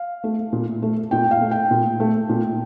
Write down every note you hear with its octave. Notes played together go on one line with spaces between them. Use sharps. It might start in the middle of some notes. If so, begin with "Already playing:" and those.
Already playing: F5
A3
A#2
A3
A#2 G5
F5
A3
G5
A#2
A3
A#2